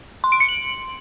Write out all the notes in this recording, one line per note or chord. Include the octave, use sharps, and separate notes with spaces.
C6
D7
C#7
F#7